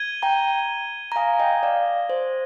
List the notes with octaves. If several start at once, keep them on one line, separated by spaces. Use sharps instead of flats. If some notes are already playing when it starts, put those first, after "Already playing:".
Already playing: G#6 D#7 G7
G5 A#5
A#5
F5 G#5 D#6 A#6 D#7
D#5 G5
D5 F5
D5
C5